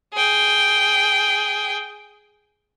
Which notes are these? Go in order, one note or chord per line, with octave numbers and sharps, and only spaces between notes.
G#4 G5